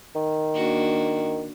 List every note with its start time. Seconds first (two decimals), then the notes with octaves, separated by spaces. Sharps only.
0.15 D#3
0.55 A#3 D4 F#4